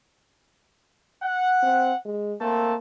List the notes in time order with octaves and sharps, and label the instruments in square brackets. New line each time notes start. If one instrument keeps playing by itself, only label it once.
[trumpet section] F#5
[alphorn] C4
G#3
[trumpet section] A3 C4 A5 [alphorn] A#3